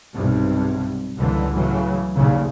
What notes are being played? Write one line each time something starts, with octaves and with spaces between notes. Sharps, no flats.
B1 G2 C3
C#2 G2 A#2 D3 E3
A2 C#3 E3 F#3
A#1 D#2 A#2 C#3